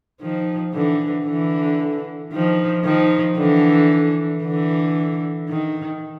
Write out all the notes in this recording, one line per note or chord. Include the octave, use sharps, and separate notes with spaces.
D#3 F3
D3 E3
D3 E3
D#3 F3
D#3 F3
D3 E3
D3 E3
D#3